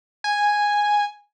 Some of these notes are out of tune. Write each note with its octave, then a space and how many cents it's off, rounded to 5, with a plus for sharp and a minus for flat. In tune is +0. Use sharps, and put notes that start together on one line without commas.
G#5 -5